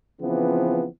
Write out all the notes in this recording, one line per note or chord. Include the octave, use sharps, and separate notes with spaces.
C#3 E3 F3 B3 C4